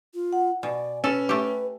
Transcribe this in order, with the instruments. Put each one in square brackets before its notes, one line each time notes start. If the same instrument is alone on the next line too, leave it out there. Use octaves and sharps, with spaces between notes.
[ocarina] F4
[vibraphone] F#5
[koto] B2 [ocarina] D5 [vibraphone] G#5
[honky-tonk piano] C#4 [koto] A4 [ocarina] B4
[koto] A3 G4